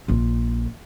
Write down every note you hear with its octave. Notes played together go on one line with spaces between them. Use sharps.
A#1 F4